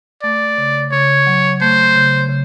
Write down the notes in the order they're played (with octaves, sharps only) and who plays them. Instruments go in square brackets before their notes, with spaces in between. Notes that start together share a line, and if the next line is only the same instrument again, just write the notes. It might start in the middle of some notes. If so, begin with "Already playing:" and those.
[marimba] A3 [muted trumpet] D5
[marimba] C#3
[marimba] C#3 [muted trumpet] C#5
[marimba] F#3
[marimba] A3 [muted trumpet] C5
[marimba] C#3
C#3